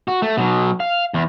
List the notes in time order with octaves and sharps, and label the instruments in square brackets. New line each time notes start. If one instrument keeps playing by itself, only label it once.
[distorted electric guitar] F#4
A3
B2 F#3
F5
E2